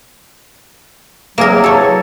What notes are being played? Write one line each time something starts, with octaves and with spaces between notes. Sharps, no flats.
E2 C3 F#3 A#3 G#4 A#4
A4 C#5